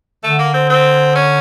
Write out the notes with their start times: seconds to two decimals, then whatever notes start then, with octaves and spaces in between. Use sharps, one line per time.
0.24 D3 A3
0.39 A#3
0.54 C4
0.70 C4
1.16 C#4